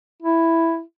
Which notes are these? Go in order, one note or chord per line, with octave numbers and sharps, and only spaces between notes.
E4